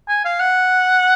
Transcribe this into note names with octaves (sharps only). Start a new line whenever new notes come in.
G#5
F5
F#5